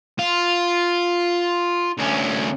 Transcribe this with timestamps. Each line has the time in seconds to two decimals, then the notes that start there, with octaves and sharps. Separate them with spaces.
0.19 F4
1.97 D2 C#4